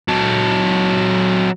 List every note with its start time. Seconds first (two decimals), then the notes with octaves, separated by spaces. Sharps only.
0.08 F#3 A4